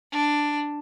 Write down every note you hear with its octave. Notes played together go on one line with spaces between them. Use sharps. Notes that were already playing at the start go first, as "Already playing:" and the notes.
D4